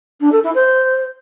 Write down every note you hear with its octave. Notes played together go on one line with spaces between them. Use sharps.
D4
A4
E4
C5